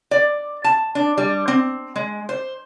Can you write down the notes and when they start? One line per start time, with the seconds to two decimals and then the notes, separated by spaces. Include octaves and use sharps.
0.11 D5
0.64 A5
0.95 D4
1.18 G3
1.48 C4
1.96 G#3
2.29 C5